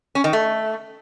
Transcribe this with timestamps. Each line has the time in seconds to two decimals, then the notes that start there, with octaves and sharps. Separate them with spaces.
0.15 C#4
0.24 D#3
0.33 A3